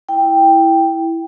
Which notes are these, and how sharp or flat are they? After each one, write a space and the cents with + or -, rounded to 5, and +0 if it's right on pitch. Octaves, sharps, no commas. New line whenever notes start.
E4 +0 G5 +5